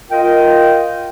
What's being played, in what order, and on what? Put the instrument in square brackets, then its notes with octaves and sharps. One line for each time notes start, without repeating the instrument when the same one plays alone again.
[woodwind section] F4 A#4 D#5 G5